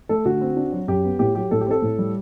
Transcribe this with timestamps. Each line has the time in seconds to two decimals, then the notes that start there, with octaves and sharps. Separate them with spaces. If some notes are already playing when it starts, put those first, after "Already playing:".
0.09 A3 A4
0.25 D3 F#4
0.41 C4
0.57 D4
0.72 F#3
0.88 F#2 G4
1.04 B3
1.19 A2 G4
1.35 F#3 G4
1.51 A2 A4
1.61 G4
1.67 C4 A4
1.82 A2
1.98 G3